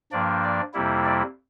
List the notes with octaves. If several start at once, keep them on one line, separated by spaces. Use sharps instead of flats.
G2 F3 A#3 D4 D5
D5
F2 C3 G3 A#3 E4
D5